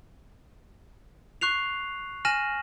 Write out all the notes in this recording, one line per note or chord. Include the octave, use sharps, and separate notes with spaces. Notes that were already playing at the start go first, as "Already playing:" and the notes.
C#6 F#6 C7 F7
G#5 F6 A#6 D#7 E7 F#7